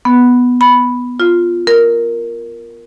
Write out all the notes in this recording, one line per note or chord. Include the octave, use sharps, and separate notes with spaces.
B3
B5
F4
A#4